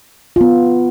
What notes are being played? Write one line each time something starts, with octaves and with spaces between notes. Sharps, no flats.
B3 F4